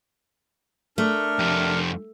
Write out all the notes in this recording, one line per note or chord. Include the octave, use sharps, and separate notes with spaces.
A3 D4 A#4
F2 G4